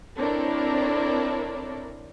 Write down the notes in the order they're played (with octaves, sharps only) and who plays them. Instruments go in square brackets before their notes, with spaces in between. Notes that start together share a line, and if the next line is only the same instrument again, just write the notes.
[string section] C4 D4 E4 A4 A#4 C#5